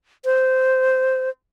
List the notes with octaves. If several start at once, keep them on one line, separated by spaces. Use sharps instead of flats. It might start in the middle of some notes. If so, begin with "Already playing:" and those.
C5